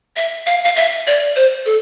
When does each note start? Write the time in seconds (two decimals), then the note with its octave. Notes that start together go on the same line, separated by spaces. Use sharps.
0.16 E5
0.46 F5
0.65 F5
0.76 E5
1.07 D5
1.36 C5
1.66 A4